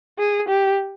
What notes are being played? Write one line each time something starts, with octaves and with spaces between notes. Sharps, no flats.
G#4
G4